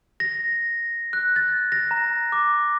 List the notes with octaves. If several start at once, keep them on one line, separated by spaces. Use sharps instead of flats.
A#6
F#6
A6
A#6
A#5
D6